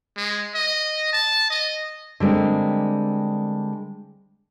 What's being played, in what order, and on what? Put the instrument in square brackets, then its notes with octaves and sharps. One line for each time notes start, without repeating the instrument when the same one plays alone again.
[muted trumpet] G#3
D#5
A5
D#5
[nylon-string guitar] D3 G3 G#3 A#3 C4